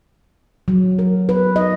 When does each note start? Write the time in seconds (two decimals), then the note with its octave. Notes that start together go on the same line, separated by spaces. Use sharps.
0.68 F#3
0.99 A#4
1.29 B4
1.56 D#5